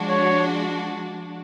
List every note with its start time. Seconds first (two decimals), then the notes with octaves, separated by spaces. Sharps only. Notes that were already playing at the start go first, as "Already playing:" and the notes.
Already playing: F3 G#3 D4 F#4
0.09 C#5